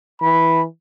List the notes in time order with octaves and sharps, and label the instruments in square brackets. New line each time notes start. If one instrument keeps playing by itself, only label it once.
[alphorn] E3 [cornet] B5